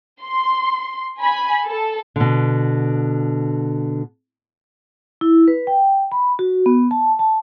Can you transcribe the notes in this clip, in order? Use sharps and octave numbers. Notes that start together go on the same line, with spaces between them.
C6
G#5 B5
A4
B2 D3
E4
B4
G5
B5
F#4
B3
A5
A5